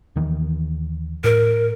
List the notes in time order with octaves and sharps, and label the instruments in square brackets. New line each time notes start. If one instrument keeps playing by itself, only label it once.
[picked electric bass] D#2 D#3 E3
[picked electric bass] A2 [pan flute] A#4